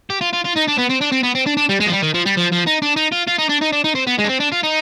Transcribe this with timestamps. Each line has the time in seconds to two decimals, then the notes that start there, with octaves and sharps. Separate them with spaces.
0.10 G4
0.21 F4
0.33 F4
0.44 F4
0.56 D#4
0.67 D4
0.78 B3
0.89 C4
1.01 D4
1.12 C4
1.23 B3
1.35 C4
1.46 D4
1.57 D4
1.69 G3
1.80 G#3
1.86 F3
1.92 G3
2.02 D#3
2.14 F3
2.26 G3
2.37 F3
2.52 F3
2.67 D#4
2.82 D4
2.97 D#4
3.12 F4
3.28 F4
3.39 D#4
3.50 D4
3.62 D#4
3.73 D4
3.84 D#4
3.95 C4
4.07 B3
4.18 G#3
4.24 D4
4.29 C4
4.40 D4
4.52 F4
4.64 D#4